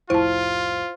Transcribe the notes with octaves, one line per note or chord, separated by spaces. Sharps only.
C2 F2 A2 E4 F4 C5 A5